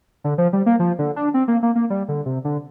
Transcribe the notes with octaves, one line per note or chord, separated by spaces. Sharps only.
D3
F3
G3
A#3
F3
D3
D4
C4
A#3
A#3
A#3
G3
D3
C3
D3